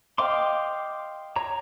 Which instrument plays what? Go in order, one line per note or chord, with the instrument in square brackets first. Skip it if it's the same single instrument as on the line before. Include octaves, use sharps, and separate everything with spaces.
[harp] D#5 F5 G5 [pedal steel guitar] C6 D6
[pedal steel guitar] C#5 A#5